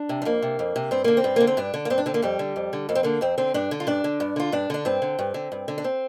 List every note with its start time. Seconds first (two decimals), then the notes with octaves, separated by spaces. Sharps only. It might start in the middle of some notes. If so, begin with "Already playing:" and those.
Already playing: D4
0.09 C3
0.22 G3
0.25 F2 A#3
0.42 C3
0.59 F2
0.76 C3
0.91 G2 C4
1.04 D3 A#3
1.17 C4
1.24 G2
1.36 D3 A#3
1.47 C4
1.57 G2 D4
1.74 D3
1.85 A#3
1.90 G2 C4
1.98 D4
2.06 D3 C4
2.14 A#3
2.22 F2 G3
2.39 D3
2.56 F2
2.73 D3
2.89 F2 A#3
2.95 C4
3.03 D3 A#3
3.21 F2 C4
3.38 D3 C4
3.54 G2 D4
3.71 D3
3.80 F4
3.87 G2 D4
4.04 D3
4.20 G2
4.36 D3 F4
4.52 G2 D4
4.70 D3 D4
4.85 G2 C4
5.02 D3
5.19 G2
5.34 D3
5.52 G2
5.68 D3
5.78 D4
5.84 C4